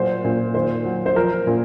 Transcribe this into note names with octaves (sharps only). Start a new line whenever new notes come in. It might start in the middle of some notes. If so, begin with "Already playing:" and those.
Already playing: A#2 F#3 C5
A#2
D#3 C5
F#3
C5
F3 A#4
A#2